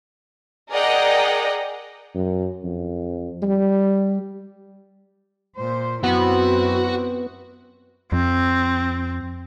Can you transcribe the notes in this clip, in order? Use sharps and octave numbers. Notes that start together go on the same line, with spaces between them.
G#4 A#4 D5 D#5 F#5 G5
F#2
F2
G3
A#2 C5
F#2 B3 C4 E4 F#4
F2 C4